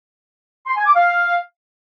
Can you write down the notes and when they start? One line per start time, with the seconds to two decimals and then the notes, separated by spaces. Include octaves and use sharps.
0.67 C6
0.76 G#5
0.86 D6
0.95 F5